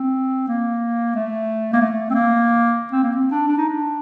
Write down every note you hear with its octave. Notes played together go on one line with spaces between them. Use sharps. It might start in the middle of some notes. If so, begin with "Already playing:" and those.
Already playing: C4
A#3
A3
A#3
A3
C4
A#3
C4
A#3
C4
D4
D4
D#4
D4